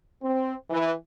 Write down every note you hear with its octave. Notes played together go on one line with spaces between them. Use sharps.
C4
E3